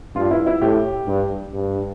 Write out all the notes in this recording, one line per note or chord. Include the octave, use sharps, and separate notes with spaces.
G2 F4
E4
E4
A2 G4
G2
G2